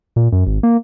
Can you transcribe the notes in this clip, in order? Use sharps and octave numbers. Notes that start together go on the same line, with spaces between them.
A#2
F#2
G#1
A#3